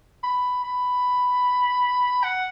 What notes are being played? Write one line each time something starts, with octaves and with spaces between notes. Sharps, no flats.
B5
B5
F#5